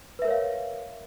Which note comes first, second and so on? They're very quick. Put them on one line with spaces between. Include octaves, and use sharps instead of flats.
B4 E5 A#4 C#5 F5